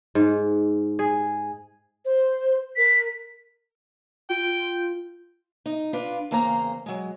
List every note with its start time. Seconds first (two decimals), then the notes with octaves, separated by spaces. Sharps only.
0.15 G#2
0.99 G#4
2.05 C5
2.77 A#4 B6
4.30 F4 G5
5.66 D#4
5.93 D4 F4 B4
6.31 E2 C#3 A#3 C5 A#5
6.86 F#3 G#3